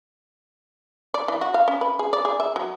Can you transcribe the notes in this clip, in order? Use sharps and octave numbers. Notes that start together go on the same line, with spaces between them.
D5
E3
F#4
F5
C#4
B4
G#4
D5
G#4
E5
F#3